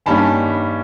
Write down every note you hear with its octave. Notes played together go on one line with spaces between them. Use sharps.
G2 D#3 G3 A#3 C#4 A5 B5